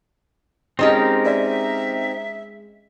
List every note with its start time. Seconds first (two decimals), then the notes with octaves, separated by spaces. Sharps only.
0.79 G#3 C4 C#4 D#4 G4 A#4 D#5 A5
1.25 B4 D5 E5 A#5